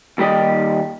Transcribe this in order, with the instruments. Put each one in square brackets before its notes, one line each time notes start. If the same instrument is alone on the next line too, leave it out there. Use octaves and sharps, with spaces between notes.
[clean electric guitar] D#2 G3 G4 D5 D#5